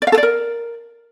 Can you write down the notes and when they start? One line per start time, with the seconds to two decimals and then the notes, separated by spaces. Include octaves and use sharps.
0.02 D5
0.07 F5
0.12 A4
0.18 D5
0.23 A#4